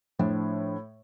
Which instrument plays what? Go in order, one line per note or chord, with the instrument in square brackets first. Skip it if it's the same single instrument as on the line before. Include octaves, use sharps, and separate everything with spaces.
[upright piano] A2 [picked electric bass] F3 D4